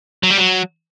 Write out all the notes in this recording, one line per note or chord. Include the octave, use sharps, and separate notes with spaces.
F#3
G3
F#3